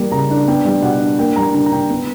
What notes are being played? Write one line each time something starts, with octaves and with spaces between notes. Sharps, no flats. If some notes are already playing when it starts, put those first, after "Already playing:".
Already playing: G3 A#3
C#3 A#5
D4
B3 G5
G3
B2 F#5
D4
A#3 G5
G3 A#5
D3 A#5
A#5
D3 G5
B3